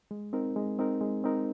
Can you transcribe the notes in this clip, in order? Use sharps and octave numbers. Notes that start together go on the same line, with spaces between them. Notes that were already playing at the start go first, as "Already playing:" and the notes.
G#3
C4 D#4 A#4
G#3
C4 D#4 A#4
G#3
C4 D#4 A#4